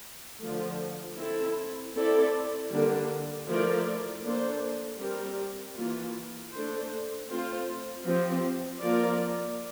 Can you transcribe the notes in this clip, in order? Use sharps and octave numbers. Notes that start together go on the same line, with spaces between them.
D3 F3 A3
C4 E4 A4
C4 E4 A4 D5
D3 G3 A#3 D4
F3 A3 E4 A#4 D5
A#3 D4 A4 C5
G3 C4 G4 A#4
E3 A#3 F4
A3 D4 A4 C5
A3 C4 F4 C5
F3 C4 G4
F3 A#3 F4 A#4 D5